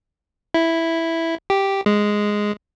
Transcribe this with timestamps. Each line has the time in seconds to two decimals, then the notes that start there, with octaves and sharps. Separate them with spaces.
0.54 E4
1.50 G4
1.86 G#3